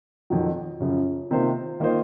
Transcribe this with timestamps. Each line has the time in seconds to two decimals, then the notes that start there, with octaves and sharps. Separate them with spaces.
0.30 F2 D#3 F#3
0.80 F#2 C#3 F3
1.31 C3 D#3 A#3 F4 C5
1.80 D#3 A#3 F4 C5 D#5